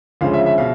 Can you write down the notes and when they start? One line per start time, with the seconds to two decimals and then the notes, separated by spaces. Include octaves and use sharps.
0.21 D2 C#3 F3 G#3 F5
0.33 E5
0.46 E5
0.58 B2 F5